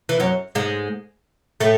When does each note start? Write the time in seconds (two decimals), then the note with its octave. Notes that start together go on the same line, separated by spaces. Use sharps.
0.09 E3
0.20 F#2 F#3
0.55 G#2 G#3
1.60 A2 A3